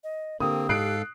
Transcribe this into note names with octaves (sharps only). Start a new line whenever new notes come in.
D#5
D3 A#3 C4 G4 D#6
G#2 A4 F5 F#6 C7 D7